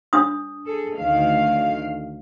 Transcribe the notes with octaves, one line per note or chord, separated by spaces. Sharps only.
D4 D#6
G#4 A4
D2 D#3 F5